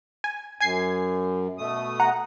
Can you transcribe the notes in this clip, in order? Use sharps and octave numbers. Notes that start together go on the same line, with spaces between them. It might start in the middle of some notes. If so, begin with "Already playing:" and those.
G#5
F#2 G#5 G#6 C7
B2 A3 D#6
F#5 A#5